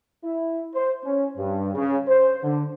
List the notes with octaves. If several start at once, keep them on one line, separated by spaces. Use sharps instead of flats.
E4
C5
C#4
G2
C#3
C5
D3